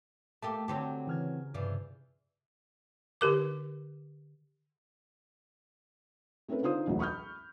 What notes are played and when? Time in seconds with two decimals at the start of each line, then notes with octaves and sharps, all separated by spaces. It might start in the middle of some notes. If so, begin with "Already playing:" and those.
0.42 A3 A#3 G4 A5
0.68 D3 F#3 C4 G4
1.07 C#3 E3 F6 G#6
1.54 G2 C3 E3 F3 D4
3.21 D3 G4 A#4 D6
6.48 A3 C4 C#4 A#4 B4
6.62 D3 D#4 F4 C5 D#6
6.86 E1 A1 D2 F#3
6.99 B5 C#6 D#6 F6 G6